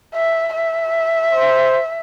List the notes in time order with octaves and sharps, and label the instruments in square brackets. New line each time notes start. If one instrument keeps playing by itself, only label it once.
[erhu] E5
E5
[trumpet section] C5